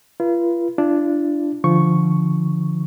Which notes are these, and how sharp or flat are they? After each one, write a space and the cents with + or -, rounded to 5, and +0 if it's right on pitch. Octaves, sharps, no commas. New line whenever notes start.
F4 -35 B4 -35
D4 +0 F4 -45
D3 +0 F3 -20 C#6 +0